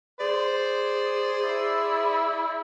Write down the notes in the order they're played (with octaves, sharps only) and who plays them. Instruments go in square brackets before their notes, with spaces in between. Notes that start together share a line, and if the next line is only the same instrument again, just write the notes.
[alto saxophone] G#4 [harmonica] C5 [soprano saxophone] D5
[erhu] E4